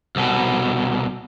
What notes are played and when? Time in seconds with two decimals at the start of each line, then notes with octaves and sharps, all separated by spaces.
0.16 C2 B2